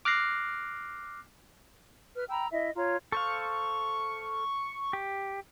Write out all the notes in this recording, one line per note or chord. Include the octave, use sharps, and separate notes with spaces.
D6 F6 F#6 A#6 C7
B4 F6
G5 A#5 B5 E6
E4 D#5 E5
F4 C#5 A#5
A4 C5 F5 C#6
G4